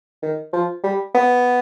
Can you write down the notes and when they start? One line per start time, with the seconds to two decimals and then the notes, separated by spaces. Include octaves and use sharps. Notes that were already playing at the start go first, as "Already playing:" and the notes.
0.23 D#3
0.53 F3
0.84 G3
1.15 B3